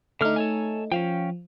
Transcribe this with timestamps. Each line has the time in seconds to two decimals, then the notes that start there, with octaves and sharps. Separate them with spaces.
0.21 D3 A3 D#4 F6
0.36 A4 C#5 G#5
0.92 F3 C#4 F5 G5